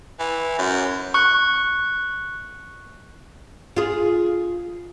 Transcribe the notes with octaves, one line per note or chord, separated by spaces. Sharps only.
E3
F#2
C#6 F#6
F4 G#4